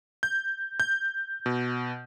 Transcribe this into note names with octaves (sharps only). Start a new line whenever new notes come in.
G6
G6
B2